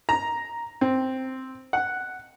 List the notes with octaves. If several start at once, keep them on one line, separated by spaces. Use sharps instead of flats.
A#5
C4
F#5